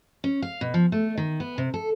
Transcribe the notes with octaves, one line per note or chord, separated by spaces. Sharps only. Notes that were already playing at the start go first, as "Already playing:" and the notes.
C#4
F5
B2
F3
A3
D#3
B3
C3
A4